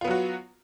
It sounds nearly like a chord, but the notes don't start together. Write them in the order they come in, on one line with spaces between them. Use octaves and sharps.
F4 B3 F#3 F#4